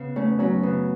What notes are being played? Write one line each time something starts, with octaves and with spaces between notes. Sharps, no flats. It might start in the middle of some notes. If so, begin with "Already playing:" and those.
Already playing: C#3 B3
A3 C#4
B3
F#3 C#4
C#3 B3